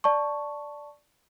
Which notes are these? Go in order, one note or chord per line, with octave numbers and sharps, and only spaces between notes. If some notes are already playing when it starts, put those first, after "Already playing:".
D5 A5 C#6